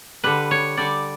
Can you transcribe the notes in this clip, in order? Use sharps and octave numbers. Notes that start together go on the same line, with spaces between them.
D3 G3 B4
C#5
D3 G3 D5